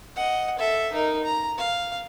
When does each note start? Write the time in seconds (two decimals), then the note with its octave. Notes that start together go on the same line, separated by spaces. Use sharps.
0.16 D#5 F#5
0.59 A4 E5
0.93 D#4 A#4
1.24 A#5
1.58 F5